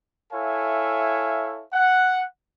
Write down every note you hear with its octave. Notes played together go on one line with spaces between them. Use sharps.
E4 A4 C#5 E5 F5 G#5
F#5